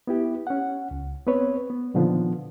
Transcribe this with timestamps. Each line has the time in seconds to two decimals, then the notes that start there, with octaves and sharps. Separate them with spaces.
0.07 B3 E4 G4
0.47 C#4 F#5
0.91 C#2
1.27 B3 C4 B4 C#5
1.70 B3
1.94 A#2 D3 D#3 F3 B3